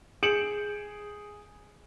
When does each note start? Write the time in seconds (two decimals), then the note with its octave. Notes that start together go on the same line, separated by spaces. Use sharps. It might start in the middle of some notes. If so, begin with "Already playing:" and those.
0.23 G#4 G6 C#7 D7 E7 F#7